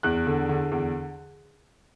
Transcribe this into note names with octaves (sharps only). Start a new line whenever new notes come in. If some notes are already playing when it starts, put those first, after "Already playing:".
E2 F#6
D3
D3
E2